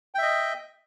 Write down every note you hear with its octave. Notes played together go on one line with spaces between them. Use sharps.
D#5 E5 G5